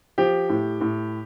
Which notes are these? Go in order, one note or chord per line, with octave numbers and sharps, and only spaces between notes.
F3 G4
A2
A2